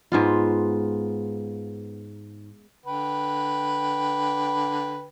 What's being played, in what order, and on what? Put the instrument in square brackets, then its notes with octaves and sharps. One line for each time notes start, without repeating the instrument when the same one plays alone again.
[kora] G#2 B3 F4
[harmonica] D3 B4 G5